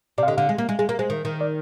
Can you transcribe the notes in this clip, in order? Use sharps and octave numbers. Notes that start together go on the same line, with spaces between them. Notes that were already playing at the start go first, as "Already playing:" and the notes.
C3 D5
F5
D3 D#5
D3 F5
G#3
A#3
G#3
G#3 G#4
A#3 A#4
G#3 C5
D#3
D#3
D5